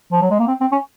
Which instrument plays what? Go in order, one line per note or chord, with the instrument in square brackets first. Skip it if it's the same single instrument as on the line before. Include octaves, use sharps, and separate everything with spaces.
[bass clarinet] F3
F#3
G#3
A#3
C4
C4
C#4